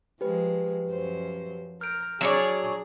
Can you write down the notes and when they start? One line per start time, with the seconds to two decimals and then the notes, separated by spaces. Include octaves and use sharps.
0.21 F3 G#3 G4 B4
0.87 F#2 F3 C5
1.81 A#4 F6 G6 D7
2.21 F#3 D4 G#4 C#5 D5